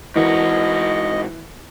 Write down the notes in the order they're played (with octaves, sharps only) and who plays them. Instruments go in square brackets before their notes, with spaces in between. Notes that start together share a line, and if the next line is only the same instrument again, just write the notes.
[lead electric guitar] G#2 F#4 [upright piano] E3 A#4 [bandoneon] D#5